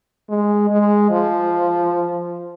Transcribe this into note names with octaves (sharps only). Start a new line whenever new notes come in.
G#3
G#3
F3